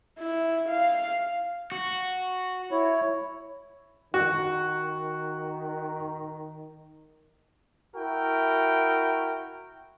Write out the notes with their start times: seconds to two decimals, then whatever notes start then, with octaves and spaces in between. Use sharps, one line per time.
0.20 E4
0.69 F5
1.72 F#4
2.71 E4 C#5
4.14 D#3 F#4
7.96 E4 F#4 A#4 G5